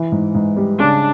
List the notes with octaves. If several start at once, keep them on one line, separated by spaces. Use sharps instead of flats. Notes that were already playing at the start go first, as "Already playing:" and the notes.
Already playing: E3
G#2
G#2
G3
C#3 D4